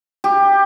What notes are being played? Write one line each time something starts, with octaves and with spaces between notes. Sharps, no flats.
G4